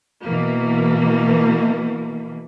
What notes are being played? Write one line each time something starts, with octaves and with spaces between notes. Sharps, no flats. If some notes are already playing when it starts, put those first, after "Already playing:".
B2 E3 A#3